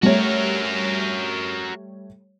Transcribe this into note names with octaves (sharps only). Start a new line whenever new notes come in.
G3 A3 F#4 A#4 C#5